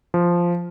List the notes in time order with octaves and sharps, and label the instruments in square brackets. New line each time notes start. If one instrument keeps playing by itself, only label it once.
[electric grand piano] F3